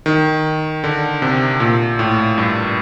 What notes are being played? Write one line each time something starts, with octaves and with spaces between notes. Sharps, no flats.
D#3
D3
C3
A#2
A2
G2